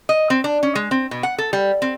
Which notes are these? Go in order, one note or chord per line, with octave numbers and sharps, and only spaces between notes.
D#5
C4
D4
C#4
G#3
C4
B2
F#5
A4
G3
C4